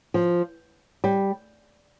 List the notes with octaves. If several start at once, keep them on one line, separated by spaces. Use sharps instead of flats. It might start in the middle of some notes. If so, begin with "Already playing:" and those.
F3
G3